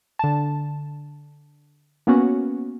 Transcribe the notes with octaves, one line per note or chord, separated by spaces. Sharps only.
D3 A5
A#3 B3 C#4 F#4